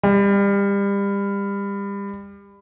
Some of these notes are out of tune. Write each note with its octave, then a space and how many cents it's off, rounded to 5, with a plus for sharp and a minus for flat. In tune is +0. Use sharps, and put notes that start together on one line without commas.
G3 +30